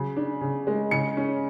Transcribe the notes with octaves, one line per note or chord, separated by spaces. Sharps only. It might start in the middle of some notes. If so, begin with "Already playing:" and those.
Already playing: C#3 F#3
D4
C#3
G#3
C#3 C#7
C#4